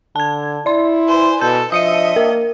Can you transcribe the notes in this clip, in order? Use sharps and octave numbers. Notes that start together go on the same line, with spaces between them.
D3 A5 G#6
E4 D5 C6
B4 C5 G#5
B2 A4 G6
F3 D4 D#5 E5 D#6 C#7 D#7
A#3 A#4